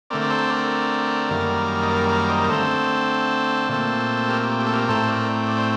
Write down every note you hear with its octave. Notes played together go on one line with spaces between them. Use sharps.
D3 A3 C4 A#4 D5
D5
A4 C5
A#4 D5
F#2 D#3 G3 A#3
D#5
A#4 D5
A#4 D5
C5 D#5
A#4
D3 A3 C4 A4 C5
A#2 A3 C4
G4 A#4
G4
G4
A4
G4 A#4
A2 A3 C4 A4 C5
A#4 D5
D5
C5